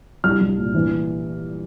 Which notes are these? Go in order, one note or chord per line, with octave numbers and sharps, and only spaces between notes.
C2 F6
C2
A#2
E3